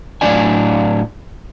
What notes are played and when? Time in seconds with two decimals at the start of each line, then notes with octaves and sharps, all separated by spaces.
0.21 A2 F#3 B3 D4 D5 G#5